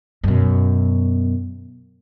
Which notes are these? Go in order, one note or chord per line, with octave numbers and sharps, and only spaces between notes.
F#2 B2